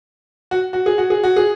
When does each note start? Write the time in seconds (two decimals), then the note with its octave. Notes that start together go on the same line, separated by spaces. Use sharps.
0.51 F#4
0.73 F#4
0.86 G#4
0.98 F#4
1.10 G#4
1.24 F#4
1.36 G#4